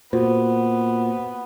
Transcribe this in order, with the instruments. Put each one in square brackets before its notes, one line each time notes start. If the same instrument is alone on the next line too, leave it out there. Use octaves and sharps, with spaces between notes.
[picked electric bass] A#2 [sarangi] B3 [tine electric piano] F#4 C5